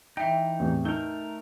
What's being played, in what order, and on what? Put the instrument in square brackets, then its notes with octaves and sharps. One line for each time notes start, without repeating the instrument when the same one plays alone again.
[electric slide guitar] E3 D#4 [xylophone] E5 G5
[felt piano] E2 A2 C3
[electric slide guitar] A3 A#4 [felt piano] D#4 [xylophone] G6 G7